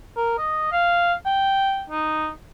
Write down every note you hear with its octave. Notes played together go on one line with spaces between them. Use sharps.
A#4
D#5
F5
G5
D#4